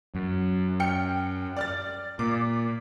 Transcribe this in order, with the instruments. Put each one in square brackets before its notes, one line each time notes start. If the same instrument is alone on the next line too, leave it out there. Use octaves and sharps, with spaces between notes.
[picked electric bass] F#2
[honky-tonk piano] G5 F6 C#7
D5 F6 A6
[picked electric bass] A#2 [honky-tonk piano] D6